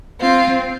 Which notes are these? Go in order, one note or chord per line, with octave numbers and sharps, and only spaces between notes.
C4 F4